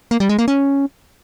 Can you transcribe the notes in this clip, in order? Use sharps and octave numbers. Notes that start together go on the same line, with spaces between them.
A#3
G3
G#3
A#3
C#4